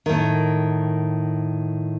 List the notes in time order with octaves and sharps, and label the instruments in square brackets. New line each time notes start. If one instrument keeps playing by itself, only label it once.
[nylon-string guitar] A2 D#3